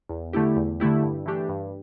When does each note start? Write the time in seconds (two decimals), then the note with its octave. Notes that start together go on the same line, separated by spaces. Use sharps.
0.09 E2
0.33 D3 A3 E4 G4
0.56 E2
0.80 D3 A3 E4 G4
1.03 G2
1.26 E3 A3 D4 G4
1.49 G2